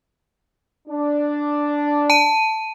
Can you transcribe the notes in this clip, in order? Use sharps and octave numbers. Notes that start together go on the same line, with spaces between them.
D4
A5 D#7